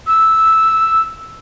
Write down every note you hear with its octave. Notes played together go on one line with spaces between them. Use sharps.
E6